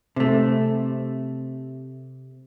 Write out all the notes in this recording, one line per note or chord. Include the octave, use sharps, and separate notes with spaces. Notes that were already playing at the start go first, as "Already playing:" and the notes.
C3 A3